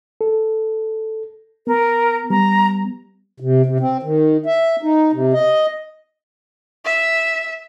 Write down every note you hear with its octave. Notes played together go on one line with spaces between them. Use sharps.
A4
B3 A#4
G3 B3 A#5
C3
C3
C4
D#3
E5
D#4
C3
D#5
E5